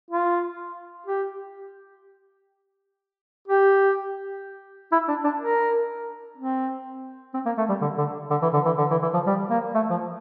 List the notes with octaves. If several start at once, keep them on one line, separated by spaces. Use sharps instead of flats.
F4
G4
G4
E4
D4
D4
A#4
C4
C4
A#3
A3
G3
D3
D3
D3
E3
D3
E3
D3
E3
E3
F3
G3
A#3
A3
F3